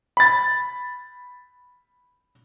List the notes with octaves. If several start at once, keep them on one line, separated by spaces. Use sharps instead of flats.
B5 A6